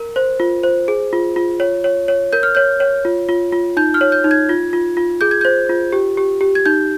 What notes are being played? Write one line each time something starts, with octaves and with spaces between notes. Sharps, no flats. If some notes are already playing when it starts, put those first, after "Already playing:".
Already playing: A#4
C5
F4
C5
G#4
F4
F4
C#5
C#5
C#5
A#4 G6
F6
C#5 G6
C#5
F4
F4
F4
D#4 G6
F6
C#5
G6
D#4
G#6
F4
F4
F4
G#4 G6
G#6
C5 G6
F4
G4
G4
G4
G#6
D#4 G6